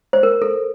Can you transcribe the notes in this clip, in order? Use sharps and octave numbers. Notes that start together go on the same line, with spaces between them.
C5
A#4
A4